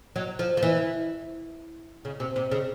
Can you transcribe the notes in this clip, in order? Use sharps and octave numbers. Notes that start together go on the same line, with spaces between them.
F#3
F3
F3
E3
C#3
C3
C3
C#3